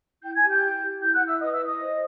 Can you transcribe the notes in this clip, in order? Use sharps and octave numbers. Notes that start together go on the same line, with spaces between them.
E4 G5 G6
G#5 G#6
G4
G5 G6
E4
G4
E4 G5 G6
F#5 F#6
E4
E5 E6
B4 D#5 D#6
E5 E6
E4
D#5 D#6
C5